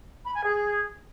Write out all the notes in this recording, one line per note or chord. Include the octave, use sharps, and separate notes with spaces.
B5
G#5
G#4